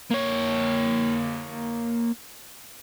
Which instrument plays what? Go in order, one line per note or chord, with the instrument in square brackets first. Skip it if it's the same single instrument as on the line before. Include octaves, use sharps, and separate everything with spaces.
[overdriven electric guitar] A#3 C#5